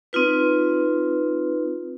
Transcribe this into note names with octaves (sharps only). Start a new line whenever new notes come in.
C4 D#4 F4 B4